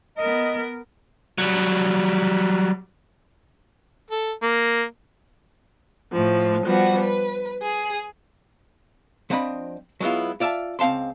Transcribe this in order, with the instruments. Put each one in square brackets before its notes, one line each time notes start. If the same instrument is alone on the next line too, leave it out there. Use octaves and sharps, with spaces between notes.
[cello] B3 A#4 [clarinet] D#5
[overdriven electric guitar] F#3 G3
[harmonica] A4
A#3
[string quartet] A2 F3
F3 G3 B3 F#4
B4
G#4
[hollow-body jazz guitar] F3 C4 D4 D#5 A5 B5
F#3 G#3 B3 E4 F4
F4 D5 E5 G#5 A5
C#2 C4 F5 A5 C6